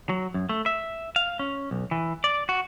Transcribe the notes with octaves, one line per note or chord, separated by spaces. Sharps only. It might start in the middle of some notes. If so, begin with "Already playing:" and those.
F#3
F#2
A3
E5
F5
C#4
B1
E3
D5
F#4